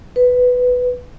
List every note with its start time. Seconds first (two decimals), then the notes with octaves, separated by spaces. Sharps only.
0.16 B4